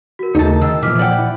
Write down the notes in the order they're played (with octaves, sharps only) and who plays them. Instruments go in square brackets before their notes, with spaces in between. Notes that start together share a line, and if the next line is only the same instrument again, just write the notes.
[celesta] F#4 A#4
[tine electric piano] D#2 C#3 A3 [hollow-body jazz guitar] D#4 A5 [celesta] G#4 A#4
[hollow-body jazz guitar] D#3 [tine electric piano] E6
[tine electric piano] A#2 F3 [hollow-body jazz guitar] E3 [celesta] D6 F6 B6
[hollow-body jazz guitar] D5 F#5 G5
[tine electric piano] E4